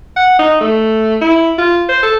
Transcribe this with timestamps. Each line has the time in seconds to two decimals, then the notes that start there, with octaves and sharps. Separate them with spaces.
0.16 F#5
0.39 D#4
0.61 A3
1.21 E4
1.58 F4
1.89 C5
2.03 A4